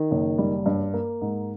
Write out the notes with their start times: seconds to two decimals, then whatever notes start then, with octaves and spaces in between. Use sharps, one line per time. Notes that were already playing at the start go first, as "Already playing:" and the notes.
Already playing: D#3
0.11 F#1
0.38 G3
0.66 G2
0.94 A#3
1.21 G#2